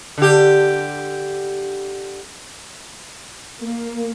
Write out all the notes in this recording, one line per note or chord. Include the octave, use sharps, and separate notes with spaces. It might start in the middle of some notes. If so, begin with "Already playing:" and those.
D3 G4
A#3